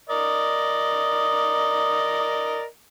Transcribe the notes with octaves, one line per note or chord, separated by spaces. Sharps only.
A#4 D5 D#5